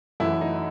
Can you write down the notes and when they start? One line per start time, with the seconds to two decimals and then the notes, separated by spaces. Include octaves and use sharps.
0.20 F#2 E3 A3 E4
0.41 D#4